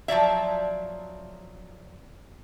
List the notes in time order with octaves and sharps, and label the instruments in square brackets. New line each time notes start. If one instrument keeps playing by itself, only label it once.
[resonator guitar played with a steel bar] F3 F#3 D5 E5